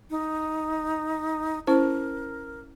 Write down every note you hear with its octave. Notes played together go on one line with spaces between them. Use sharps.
D#4
C#4 E4 A#4 C5